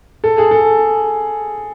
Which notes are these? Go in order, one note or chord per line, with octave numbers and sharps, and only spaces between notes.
A4
G#4
A4